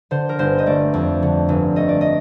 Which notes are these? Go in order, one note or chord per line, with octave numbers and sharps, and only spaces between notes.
D3 C5
A#4
G1 C5
D#5
A3 D5
F2
D3
G1
A3 D#5
D5
D#5